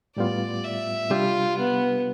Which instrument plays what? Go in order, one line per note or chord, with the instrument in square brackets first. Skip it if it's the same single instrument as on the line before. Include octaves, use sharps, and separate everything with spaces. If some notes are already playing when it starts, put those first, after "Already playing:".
[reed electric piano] A2 G3 B3 F4 [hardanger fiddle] D5
[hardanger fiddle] E5
[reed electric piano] C3 G3 D4 G4 [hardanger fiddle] F4
[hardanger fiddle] B3